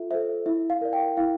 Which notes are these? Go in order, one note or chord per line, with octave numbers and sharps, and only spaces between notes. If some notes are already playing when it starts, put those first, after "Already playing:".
Already playing: F4 A4 E5
A4 C5 E5
E4 E5
F5
A#4 D5
G5
E4 F5